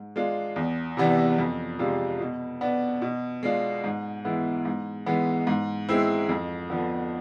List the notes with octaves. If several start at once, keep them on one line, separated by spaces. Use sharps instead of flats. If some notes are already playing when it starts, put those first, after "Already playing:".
Already playing: G#2
G#3 D4 F4
E2
C3 E3 B3 D4
F2
C3 G#3 D4 F4
B2
B3 D4
B2
G#3 D4 F4
G#2
E3 G#3 B3 E4
G#2
E3 G#3 B3
G#2
G#3 C4 E4
F2
D3 F3 B3